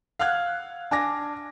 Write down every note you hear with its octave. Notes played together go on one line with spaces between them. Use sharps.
F5 F#5 F6 F#6 G#6
D4 G#5 D6 A#6